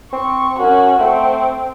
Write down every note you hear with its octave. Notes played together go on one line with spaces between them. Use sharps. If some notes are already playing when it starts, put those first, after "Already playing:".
C4 C#6
F#2 C#4 F#4
A3 C4